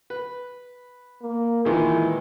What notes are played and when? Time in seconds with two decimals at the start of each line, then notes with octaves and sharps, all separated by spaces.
0.10 B4
1.22 A#3
1.65 A#2 D#3 E3 G#3